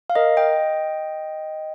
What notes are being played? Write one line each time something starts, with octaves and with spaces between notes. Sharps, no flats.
F5
A#4 D#5
D#5 G5